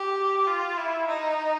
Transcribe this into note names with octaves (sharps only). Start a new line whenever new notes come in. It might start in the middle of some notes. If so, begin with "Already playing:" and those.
Already playing: G4
F4
E4
D#4